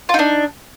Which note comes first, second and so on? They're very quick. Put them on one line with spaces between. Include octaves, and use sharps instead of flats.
F4 D#4 D4